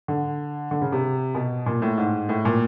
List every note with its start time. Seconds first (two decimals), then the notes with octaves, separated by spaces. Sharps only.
0.08 D3
0.71 D3
0.82 C#3
0.92 C3
1.35 B2
1.66 A#2
1.82 A2
1.98 G#2
2.29 A2
2.45 A#2